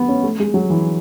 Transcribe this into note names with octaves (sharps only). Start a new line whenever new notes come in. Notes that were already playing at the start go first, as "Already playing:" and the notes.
Already playing: B3
C#4
A3
G#3
F#3
E3